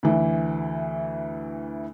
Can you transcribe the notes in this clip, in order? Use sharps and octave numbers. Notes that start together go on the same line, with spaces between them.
D2 E3